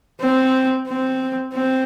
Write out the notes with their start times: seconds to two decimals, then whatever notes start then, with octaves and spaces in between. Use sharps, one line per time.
0.21 C4
0.88 C4
1.54 C4